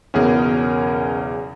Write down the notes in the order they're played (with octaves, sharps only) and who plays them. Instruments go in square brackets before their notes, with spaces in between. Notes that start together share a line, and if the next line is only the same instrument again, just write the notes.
[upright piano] B1 E2 C#3 [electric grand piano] C#4 G#4 A#4